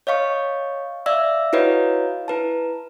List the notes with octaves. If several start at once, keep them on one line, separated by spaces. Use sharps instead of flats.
C#5 D#5 F5 C#6
D5 E5 F5 E6
E4 F#4 B4 C#5 D#5 F5
E4 B4 A5